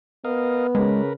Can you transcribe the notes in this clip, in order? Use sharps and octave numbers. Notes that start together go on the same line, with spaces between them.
B3 A#4 D#5 F5
C#3 G#3 A#4 B4